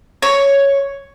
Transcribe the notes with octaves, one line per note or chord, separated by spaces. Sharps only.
C#5